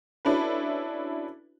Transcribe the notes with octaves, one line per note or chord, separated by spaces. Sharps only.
C#4 D4 E4 F#4 A4 B4